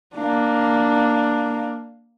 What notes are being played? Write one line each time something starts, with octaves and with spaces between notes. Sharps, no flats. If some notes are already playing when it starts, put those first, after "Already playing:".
A#3 D4